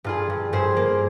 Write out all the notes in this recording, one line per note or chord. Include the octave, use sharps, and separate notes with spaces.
G2 F4 G#4
G2
G2 G#4 C5
A#3